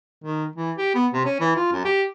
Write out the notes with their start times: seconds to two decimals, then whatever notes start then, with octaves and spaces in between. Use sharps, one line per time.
0.24 D#3
0.56 E3
0.78 G4
0.94 B3
1.14 C3
1.25 C#4
1.40 E3
1.56 F4
1.72 F#2
1.85 G4